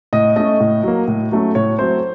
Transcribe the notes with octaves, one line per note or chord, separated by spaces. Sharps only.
A2 D#5
A3 C#4 D#5
A2
F#3 A#3
A2
F#3 A3 C#4
A2 C#5
F#3 A3 C4 C5